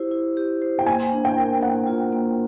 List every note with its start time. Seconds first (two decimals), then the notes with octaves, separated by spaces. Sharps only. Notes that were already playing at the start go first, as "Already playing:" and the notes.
Already playing: E4 G4 C5
0.11 E4
0.37 G4
0.62 C5
0.79 G5
0.86 A#3 G#5
1.12 D4
1.25 G5
1.37 A#4
1.61 A#3 F#5
1.87 F4
2.12 A#3